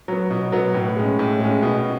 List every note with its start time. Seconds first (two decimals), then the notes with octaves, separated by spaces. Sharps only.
0.08 F#3 B3
0.31 B2
0.52 F#3 B3
0.74 A2
0.96 G#3 C#4
1.19 A2
1.40 G#3 C#4
1.62 B2